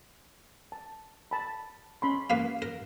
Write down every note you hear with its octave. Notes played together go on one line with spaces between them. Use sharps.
A5
A5 B5
C#4 B5 C6
A#3 B4 F5
A#4